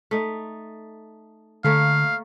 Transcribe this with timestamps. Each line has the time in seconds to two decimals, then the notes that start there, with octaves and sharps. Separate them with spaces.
0.11 A3 D#4
1.64 D3 A3 A#3 C#5 F5